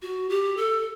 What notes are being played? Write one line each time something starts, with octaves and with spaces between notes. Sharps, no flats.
F#4
G4
A4